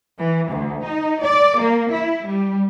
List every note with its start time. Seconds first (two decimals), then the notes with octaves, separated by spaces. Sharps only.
0.18 E3
0.50 D2
0.83 D#4
1.21 D5
1.58 A#3
1.91 E4
2.25 G3